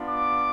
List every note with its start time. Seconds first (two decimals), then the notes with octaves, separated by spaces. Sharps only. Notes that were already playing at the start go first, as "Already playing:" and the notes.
Already playing: B3 D4 F4
0.09 D6